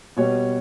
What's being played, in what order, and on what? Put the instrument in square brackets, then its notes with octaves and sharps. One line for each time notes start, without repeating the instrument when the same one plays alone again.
[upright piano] B2 G3 C#5